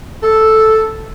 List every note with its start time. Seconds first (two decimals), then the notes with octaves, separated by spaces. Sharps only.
0.23 A4